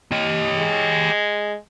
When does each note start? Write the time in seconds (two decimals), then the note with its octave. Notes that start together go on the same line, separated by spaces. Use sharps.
0.12 G4 D#5
0.58 G#3